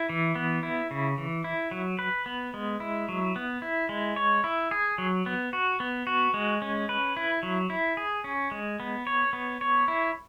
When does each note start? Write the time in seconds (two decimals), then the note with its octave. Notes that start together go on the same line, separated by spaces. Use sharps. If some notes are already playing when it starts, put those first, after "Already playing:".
Already playing: E4
0.09 E3
0.35 B3
0.63 E4
0.91 C#3
1.18 E3
1.44 E4
1.71 F#3
1.99 B4
2.26 B3
2.54 G#3
2.80 E4
3.09 F#3
3.36 B3
3.62 E4
3.89 G#3
4.16 C#5
4.44 E4
4.71 G#4
4.98 F#3
5.26 B3
5.53 F#4
5.80 B3
6.07 F#4
6.34 G#3
6.62 C#4
6.89 B4
7.17 E4
7.43 F#3
7.70 E4
7.97 G#4
8.24 C#4
8.51 G#3
8.80 B3
9.07 C#5
9.33 B3
9.61 C#5
9.88 E4